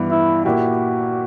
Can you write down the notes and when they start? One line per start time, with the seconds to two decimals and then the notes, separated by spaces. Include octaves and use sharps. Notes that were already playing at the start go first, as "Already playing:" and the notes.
Already playing: G2 E3 B3
0.11 E4
0.45 A#2 A#3 E4 F#4 G4